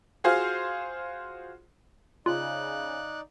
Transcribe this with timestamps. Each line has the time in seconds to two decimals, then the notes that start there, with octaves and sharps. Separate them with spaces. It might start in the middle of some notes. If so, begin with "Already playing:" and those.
0.24 F4 F#4 G#4 C5 F5
2.26 C#3 D#4 F4 D5 F#6